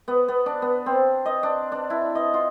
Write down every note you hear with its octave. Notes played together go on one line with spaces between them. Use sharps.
B3
B3
D4
B3
C4
D#5
D4
D4
E4
D#5
F4